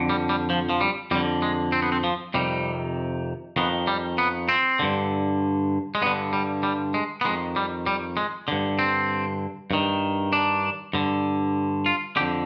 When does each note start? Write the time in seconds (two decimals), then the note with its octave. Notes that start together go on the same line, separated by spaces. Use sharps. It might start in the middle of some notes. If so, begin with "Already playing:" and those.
Already playing: F2 D3
0.09 G3
0.29 G3
0.50 F3
0.69 F3
0.81 G3
1.11 F2 D3 G3
1.42 G#3
1.72 C4
1.82 B3
1.92 C4
2.04 F3
2.34 F2 C3 D#3 G3
3.56 F2 D#3 B3
3.87 G3
4.18 B3
4.49 C4
4.79 G2 D3
5.95 G#3
6.02 G2 D3 B3
6.33 G3
6.63 G3
6.94 G#3
7.21 B3
7.24 F2 D#3 G#3
7.56 G3
7.86 G3
8.17 G#3
8.48 G2 D3
8.79 C4
9.71 G2 D#3
10.33 D4
10.93 G2 D3
11.86 F4
12.16 D3 G4
12.20 F2